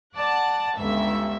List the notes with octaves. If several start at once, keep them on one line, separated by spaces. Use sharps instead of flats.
D5 F#5 A5
G1 C#2 E5